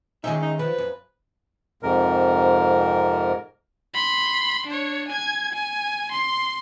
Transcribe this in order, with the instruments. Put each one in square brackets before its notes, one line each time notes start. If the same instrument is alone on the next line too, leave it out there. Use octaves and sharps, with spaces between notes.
[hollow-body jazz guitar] D#3 E5 [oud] G#3 C#4 G#4 [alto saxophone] D#4
[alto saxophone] D#4
[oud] F3 [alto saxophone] B4
[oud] F#2
[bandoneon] F2 G#2 C3 A#4
[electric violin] B5 C6
D4 C#5
G#5 G#6
G#5
C6